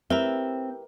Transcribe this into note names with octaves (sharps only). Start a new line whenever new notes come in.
C4 E4 G4 A#4 B4 E5 A#5